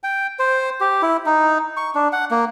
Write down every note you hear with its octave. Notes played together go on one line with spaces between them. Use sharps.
G5
C5
G4
E4
D#4
C#6
D4
F#5
A#3